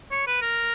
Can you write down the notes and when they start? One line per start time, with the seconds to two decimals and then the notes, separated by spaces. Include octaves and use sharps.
0.11 C#5
0.27 B4
0.42 A#4